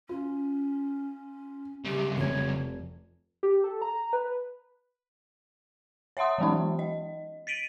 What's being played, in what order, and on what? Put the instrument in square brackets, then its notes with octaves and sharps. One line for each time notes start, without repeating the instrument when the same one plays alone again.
[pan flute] C#4 [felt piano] F4
[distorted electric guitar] C2 C#3 [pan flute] G4
[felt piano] F1 [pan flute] C#5
[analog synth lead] G4
A4
A#5
B4
[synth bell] C#5 E5 F#5 C6 D#6
E3 F#3 G#3 B3 C#4 D#4
D#5
A6 B6 D7 D#7